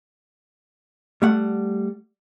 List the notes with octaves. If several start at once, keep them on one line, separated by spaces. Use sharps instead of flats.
G3 A3 F#5